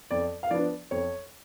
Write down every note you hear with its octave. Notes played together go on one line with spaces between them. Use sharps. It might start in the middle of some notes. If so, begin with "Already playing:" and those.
F2 D5
F5
F3 B3 D4 D5
F2 C#5